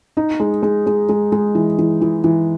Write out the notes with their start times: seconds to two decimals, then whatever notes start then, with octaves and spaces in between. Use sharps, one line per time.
0.17 D#4
0.40 G#3
0.63 G#3
0.86 G#3
1.09 G#3
1.32 G#3
1.55 E3
1.79 E3
2.01 E3
2.24 E3